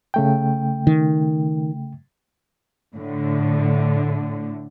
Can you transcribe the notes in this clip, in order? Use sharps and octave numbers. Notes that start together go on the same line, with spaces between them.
C#3 A3 G5
D#3
A2 D3